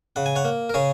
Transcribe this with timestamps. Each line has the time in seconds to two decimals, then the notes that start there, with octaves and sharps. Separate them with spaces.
0.16 C#3 F#5
0.26 G#5
0.36 C#5 F#5
0.45 A#3
0.69 A#4
0.74 C#3 G#4 C#5